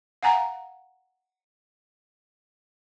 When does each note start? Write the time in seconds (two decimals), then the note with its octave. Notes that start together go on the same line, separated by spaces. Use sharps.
0.23 F5 F#5 G#5 A#5